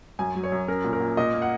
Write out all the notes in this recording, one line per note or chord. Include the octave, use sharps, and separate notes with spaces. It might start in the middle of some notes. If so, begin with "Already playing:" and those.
F#2 G#5
F#3
C#5
F#2
C#4 A#4
A#2
A#4
A#2
A#2 D#5
A#3
F#5